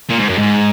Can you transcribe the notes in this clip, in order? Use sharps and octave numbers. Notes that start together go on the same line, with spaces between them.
A#2
G#2
F#2
G#2